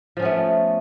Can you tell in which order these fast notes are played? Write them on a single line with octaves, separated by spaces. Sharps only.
F3 C#4 B3 A3